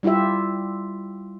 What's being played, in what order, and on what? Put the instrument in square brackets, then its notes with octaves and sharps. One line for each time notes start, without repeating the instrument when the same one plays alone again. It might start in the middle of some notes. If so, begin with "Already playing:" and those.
[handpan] G3 E4 F4 G4 E5